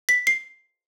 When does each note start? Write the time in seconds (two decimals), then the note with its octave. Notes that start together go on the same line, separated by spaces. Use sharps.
0.09 B6
0.27 C7